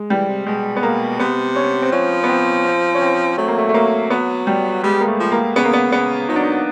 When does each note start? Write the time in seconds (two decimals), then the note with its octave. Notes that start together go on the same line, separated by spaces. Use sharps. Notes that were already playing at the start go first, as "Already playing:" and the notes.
Already playing: G#3
0.10 E3 G3
0.28 C3
0.46 B2 G#3
0.76 B3
0.83 A#3
1.20 C3 B3
1.56 C#4
1.82 C4
1.92 F3 C#4
2.24 B3
2.29 C4
2.65 C4
2.95 C#4
3.02 C4
3.38 F#3 A3
3.48 A#3
3.58 A3
3.69 A3
3.74 F#3 A#3
4.10 F#3 B3
4.47 G3
4.83 G3 G#3
5.01 A#3
5.07 A3
5.20 F3
5.32 A#3
5.56 C#3 B3
5.65 A#3
5.74 B3
5.92 C#3 B3
6.29 F#3 D#4
6.36 D4
6.43 D#4